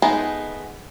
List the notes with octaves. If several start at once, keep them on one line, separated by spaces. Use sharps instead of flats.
G#3 A3 B3 D#4 G#4